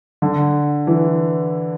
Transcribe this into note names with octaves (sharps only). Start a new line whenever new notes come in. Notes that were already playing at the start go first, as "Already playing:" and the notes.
D3
E3